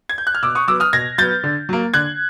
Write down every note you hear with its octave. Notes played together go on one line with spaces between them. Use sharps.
G#6
G6
F#6
F6
B2 D6 E6
C#6 D#6
F#3 B3 D6 E6
D#6 F6
B2 G#6 A#6
F#3 B3 G6 A6
D3
F#3 A#3
D3 F#6 G#6